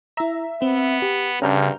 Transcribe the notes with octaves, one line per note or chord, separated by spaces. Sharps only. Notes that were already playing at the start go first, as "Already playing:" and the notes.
E4 E5 A#5
B3 C4
G4
D2 G2 C#3 A#5 F6 G6